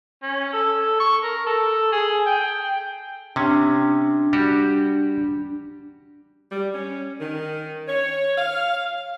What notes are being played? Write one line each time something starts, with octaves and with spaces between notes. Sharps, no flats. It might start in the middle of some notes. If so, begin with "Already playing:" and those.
C#4
A4
C#6
A#4
A4
G#4
G5
C3 C#4 D4
G3 F#4 G4
G3
C#4
D#3
C#5
F5